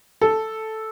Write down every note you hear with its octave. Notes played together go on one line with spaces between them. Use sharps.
A4